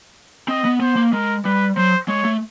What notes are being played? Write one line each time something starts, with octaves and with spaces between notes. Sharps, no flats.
C4 D#5
B3
B3 C5
A#3
G#3 A#4
G3 B4
F#3 C5
G#3 C#5
A3